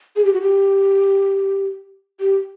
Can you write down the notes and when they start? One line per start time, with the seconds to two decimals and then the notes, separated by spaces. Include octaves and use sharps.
0.16 G#4
0.25 G4
0.33 F#4
0.42 G4
2.20 G4